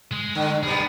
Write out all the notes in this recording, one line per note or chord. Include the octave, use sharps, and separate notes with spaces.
G#3
D3
G3 B3 G#4 A#4